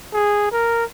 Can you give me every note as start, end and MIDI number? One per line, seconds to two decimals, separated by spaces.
0.13 0.52 68
0.52 0.84 70